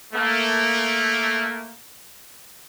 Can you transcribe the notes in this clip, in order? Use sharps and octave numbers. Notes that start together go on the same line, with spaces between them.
A3 A#3